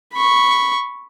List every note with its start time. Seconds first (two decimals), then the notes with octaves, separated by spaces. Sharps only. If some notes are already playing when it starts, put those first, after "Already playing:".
0.14 B5 C#6